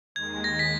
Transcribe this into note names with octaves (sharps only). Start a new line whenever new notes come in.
D#2 D#3 G#3 G#6
A#6
B6